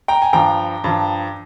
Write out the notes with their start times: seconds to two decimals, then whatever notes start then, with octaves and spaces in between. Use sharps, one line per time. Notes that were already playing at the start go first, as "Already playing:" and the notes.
0.08 G5 A#5
0.22 G#5
0.33 G2 F3 G5 A#5
0.84 G2 F3